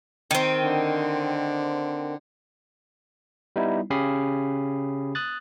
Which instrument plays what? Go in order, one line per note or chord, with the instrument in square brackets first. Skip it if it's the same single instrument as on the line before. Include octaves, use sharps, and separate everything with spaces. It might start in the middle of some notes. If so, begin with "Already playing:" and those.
[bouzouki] D#3 C4
[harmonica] D3
[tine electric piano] G3 B3 D#4 E4
C#3 C#4 G4 B5 D#6 C7
D#6 F#6 A6